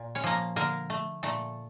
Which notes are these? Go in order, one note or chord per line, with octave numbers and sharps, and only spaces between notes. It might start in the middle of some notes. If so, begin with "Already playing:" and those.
Already playing: A#2
C#4 C#5
F3 A#3
D3 A#3 A#4
A3
A#2 A3 A4